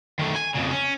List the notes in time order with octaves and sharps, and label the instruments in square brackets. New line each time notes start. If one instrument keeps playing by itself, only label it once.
[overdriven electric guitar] D#3 A3
G#5
F2 C#3
C#4